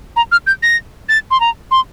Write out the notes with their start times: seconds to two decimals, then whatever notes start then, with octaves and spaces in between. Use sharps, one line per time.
0.16 A#5
0.32 F6
0.47 G6
0.63 A#6
1.09 A6
1.31 C6
1.40 A#5
1.71 C6